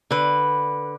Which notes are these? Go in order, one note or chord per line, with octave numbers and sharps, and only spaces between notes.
D3 B4